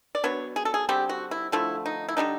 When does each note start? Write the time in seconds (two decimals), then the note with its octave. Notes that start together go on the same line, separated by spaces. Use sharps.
0.15 D5
0.24 F#3 B3 D4 C#5
0.56 G#4
0.65 A4
0.74 G#4
0.89 D3 G3 C4 G4
1.09 F#4
1.31 E4
1.52 D3 F3 A3 E4
1.86 D#4
2.08 E4
2.17 D3 G3 B3 D4 D#4